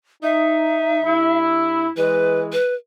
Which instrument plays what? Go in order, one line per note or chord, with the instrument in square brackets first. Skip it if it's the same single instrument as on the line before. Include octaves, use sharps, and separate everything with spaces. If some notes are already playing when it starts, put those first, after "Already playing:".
[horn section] D#4 [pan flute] E5
[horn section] G2 E4
[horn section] E3 G#3 [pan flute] B4
[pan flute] B4